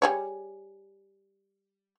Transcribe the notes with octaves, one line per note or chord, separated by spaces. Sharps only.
G3 G#4 C#5